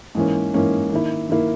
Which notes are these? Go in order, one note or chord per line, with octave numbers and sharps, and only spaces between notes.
G#2 E3 A#3 C#4
G#2 E3 A#3 C#4
D#3 A#3 E4
D#3 A#3 E4